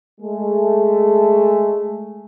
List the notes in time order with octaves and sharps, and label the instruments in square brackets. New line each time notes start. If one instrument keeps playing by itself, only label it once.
[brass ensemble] G#3 A3